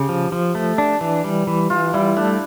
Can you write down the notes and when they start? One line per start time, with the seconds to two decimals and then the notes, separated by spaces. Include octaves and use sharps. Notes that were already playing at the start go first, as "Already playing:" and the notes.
Already playing: C#3 G4
0.09 F3
0.32 F3
0.55 A3
0.78 D4
1.01 E3
1.24 G3
1.47 E3
1.70 E3 F4
1.94 G3 E4
2.17 A3 D4